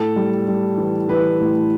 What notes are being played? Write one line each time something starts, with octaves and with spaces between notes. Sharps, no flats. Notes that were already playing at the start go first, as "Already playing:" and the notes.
Already playing: A2 A4
G3
G3
E3
E3 B4
A2